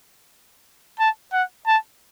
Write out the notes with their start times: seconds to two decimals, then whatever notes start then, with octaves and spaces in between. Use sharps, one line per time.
0.99 A5
1.33 F#5
1.67 A5